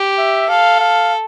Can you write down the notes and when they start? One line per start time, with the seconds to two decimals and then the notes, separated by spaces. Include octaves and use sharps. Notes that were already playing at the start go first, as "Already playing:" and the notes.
Already playing: G4
0.18 E5
0.49 A4 F5
0.80 F5